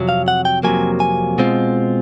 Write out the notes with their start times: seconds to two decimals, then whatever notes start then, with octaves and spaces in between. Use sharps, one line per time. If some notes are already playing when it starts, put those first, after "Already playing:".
Already playing: F2 C3 F#3
0.09 F5
0.28 F#5
0.45 G5
0.63 F2 C3 D#3 F#3 A#3 G#5
1.00 G#5
1.38 B2 G#3 C4 F4